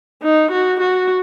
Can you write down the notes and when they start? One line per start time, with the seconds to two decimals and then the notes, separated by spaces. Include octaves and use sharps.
0.23 D#4
0.52 F#4
0.81 F#4